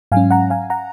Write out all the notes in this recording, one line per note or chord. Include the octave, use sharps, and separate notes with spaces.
G#2 F#3 C#4 F5 G#5
F#5 A#5
F5 G#5
F#5 A#5